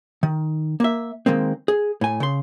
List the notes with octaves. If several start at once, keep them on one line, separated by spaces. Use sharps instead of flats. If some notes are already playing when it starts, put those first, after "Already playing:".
D#3
A#3 E5
D#3 G#3 A#3 C4
G#4
A2 G#5
C#3 C6